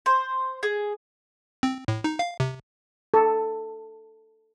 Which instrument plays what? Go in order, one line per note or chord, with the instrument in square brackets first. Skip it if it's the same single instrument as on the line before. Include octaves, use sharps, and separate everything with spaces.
[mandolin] C5
G#4
[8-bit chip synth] C4
A2
D#4
F5
C3
[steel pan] A4